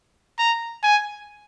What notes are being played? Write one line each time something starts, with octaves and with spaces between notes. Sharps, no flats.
A#5
G#5